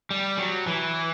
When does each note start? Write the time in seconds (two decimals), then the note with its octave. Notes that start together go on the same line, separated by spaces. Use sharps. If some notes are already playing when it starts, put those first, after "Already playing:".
0.11 G3
0.38 F#3
0.67 E3